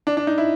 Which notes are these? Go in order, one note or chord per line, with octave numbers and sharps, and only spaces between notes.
D4
D4
D#4
E4